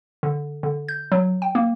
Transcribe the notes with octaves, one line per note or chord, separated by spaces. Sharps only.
D3
D3
G6
F#3
G5
A#3